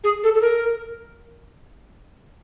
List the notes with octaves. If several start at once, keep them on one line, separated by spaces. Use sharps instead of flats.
G#4
A4
A4
A#4